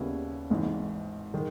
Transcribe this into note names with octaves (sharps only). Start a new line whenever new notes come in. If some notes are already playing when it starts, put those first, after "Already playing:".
Already playing: D#2 C#3 G3 B3 E4
G#1 G#2 E3
D#3 G#3